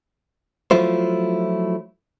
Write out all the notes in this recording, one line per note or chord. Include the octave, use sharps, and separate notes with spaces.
F3 F#3 A3 E4 F4 C5